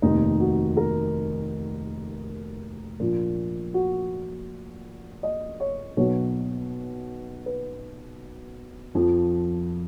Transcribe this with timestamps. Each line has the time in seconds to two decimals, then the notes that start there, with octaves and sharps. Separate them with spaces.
0.02 F1 D#2 D#3 D#4
0.40 F#4
0.77 A#4
3.00 A#1 A#2 F3
3.74 F#4
5.23 D#5
5.60 C#5
5.97 B1 B2 F#3 C#5
7.46 B4
8.95 F2 F3